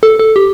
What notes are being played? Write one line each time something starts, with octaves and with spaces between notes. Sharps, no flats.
A4
A4
G4